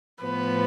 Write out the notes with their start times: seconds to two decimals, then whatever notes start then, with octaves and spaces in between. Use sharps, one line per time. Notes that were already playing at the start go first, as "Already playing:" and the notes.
0.23 A2 F3 B3 B4